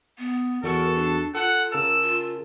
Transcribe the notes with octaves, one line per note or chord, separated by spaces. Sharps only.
B3
E2 F#4 A4 A#4 C#6
D4
F4 A4 F#5
C#3 A#4 A5 E6
F4